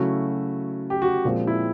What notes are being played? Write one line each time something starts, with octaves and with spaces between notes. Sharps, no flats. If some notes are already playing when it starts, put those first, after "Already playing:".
Already playing: C#3 F#3 A3 C#4 E4 F#4
G4
F#4
A#2 F3 G#3 C4
E4